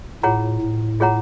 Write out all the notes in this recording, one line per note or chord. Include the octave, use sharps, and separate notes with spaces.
A2 F4 G#4 C#5 F#5 A#5
A2
F4 G#4 C#5 F#5 A#5